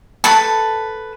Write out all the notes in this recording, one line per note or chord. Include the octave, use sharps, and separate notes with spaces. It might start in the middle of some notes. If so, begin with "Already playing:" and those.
A4 B4 A5